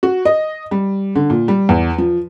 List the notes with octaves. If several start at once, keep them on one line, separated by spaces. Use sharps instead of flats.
F#4
D#5
G3
D3
A#2
G3
E2
F3